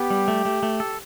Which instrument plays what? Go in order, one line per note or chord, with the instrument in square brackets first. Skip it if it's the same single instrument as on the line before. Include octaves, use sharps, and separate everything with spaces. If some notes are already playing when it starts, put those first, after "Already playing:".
Already playing: [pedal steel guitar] B3 [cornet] G4
[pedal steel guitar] G3
A3
A3
A3
A4